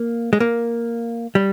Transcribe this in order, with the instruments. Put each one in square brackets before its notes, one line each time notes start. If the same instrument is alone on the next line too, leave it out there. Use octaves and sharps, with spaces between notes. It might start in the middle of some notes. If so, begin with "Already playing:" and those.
Already playing: [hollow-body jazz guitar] A#3
G#3
A#3
G3